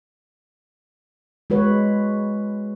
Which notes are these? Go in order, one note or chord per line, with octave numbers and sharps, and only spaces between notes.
G#3 F#4 B4 C#5